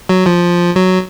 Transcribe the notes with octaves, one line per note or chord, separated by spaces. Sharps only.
F#3
F3
F#3